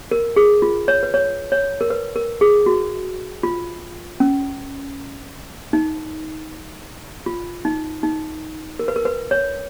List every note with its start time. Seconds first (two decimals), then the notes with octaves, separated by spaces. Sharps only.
0.11 A#4
0.36 G#4
0.62 F4
0.88 C#5
1.03 B4
1.14 C#5
1.52 C#5
1.81 A#4
1.90 B4
2.16 A#4
2.41 G#4
2.66 F#4
3.43 F4
4.20 C#4
5.73 D#4
7.26 F4
7.65 D#4
8.03 D#4
8.79 A#4
8.88 B4
8.96 A#4
9.05 B4
9.31 C#5